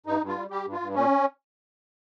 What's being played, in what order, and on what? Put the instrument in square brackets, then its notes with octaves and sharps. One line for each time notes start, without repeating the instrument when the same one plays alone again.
[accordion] G2 D#4
G2
F4
G3
G3 G4
G2
F4
G2
A#2 C#4